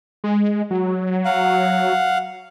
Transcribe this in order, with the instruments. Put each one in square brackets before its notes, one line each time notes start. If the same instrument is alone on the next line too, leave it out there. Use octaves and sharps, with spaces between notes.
[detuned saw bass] G#3
F#3
[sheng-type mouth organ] F5 F#5